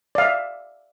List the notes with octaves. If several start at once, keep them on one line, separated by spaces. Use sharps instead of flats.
D5 E5 F5